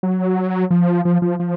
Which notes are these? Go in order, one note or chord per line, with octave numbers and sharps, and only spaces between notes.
F#3
F3
F3
F3
F3